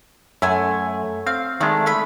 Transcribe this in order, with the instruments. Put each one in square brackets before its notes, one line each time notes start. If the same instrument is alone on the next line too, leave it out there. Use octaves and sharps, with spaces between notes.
[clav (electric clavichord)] F#2 [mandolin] A3 G#5
[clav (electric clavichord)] C4 [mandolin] F5
[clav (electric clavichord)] D#3 G#3 [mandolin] A3 D4
[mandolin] A3 B5